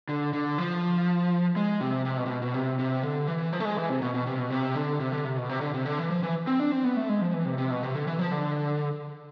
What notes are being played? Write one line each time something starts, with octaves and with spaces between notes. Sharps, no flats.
D3
D3
F3
G#3
C3
C3
B2
C3
B2
B2
C3
C3
D3
E3
F3
A3
G#3
E3
C3
B2
B2
C3
B2
C3
D3
C3
D3
C3
B2
C3
D3
C3
D3
E3
F3
E3
C4
D4
C4
B3
A3
G#3
F3
E3
C3
C3
B2
C3
D3
E3
F3
D3